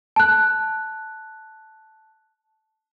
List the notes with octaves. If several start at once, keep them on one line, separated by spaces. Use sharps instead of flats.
A5 F#6